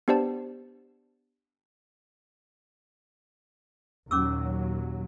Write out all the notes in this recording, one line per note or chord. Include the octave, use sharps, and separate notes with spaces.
B3 D4 G4 C5 D5 A5
D#2 A#2 F#3 C#4 D6 E6